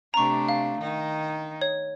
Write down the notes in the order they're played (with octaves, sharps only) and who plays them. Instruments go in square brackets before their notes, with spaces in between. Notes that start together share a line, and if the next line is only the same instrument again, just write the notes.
[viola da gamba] C3 A3 D4 [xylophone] A#5 C#6
[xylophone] F5
[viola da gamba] D#3 D#4
[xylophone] C#5